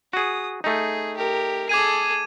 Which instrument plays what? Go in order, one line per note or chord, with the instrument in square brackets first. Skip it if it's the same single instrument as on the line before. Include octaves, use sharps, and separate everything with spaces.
[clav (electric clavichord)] F#4 G#4 [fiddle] D#6
[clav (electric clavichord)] A3 D#4 [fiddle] G#4
[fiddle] G4 A#4
[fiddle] G#4 A4 [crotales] D6 G#6 D#7